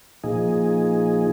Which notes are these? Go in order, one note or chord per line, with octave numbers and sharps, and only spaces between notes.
A#2 F3 D#4 G#4